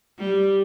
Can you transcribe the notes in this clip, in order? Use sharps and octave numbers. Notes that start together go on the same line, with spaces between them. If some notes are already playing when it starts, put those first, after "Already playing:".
G3